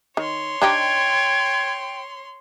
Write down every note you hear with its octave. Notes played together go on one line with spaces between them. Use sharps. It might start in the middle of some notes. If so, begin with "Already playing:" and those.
D#3 C#5 C6
D4 D#4 G4 G5 G#6